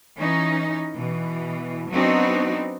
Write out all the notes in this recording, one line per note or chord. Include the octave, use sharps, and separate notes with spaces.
E3 C#4 D#4
B2 E3
F#3 B3 C4 D4 D#4 F#4